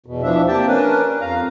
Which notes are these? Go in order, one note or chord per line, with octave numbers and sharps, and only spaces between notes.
E2 B2
E3 F3 D4 E5
C3 A#3 G4 G5 A5
C#4 D4 A#4 B4
F2 F5 A#5